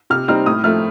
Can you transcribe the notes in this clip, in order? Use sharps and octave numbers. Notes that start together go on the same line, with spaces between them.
C3 F6
G3 C4 D#4 F6
A2 D#6
F3 A3 F6